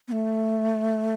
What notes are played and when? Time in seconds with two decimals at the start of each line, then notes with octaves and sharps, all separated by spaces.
0.08 B3
0.12 A3